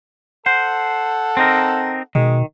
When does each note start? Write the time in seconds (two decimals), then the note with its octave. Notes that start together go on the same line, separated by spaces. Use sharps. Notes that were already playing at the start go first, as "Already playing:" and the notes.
0.46 A4 C5 F#5
1.37 C4 D#4 A#4
2.15 B2 D#3 G#3